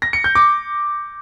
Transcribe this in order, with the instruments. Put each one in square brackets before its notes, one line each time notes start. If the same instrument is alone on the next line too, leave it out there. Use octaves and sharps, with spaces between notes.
[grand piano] A#6
C#7
G6
D6